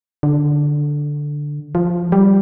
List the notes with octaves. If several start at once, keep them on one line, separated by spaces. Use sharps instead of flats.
D3
F3
G3